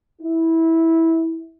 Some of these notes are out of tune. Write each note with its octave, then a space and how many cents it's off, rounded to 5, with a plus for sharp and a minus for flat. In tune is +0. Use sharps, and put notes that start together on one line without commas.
E4 -15